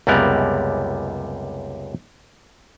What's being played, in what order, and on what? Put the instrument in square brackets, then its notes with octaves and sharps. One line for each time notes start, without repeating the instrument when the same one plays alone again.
[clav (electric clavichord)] C#2 F#2 C3 G3 B3 A#4